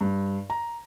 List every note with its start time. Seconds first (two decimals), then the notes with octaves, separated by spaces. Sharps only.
0.01 G2
0.50 A#5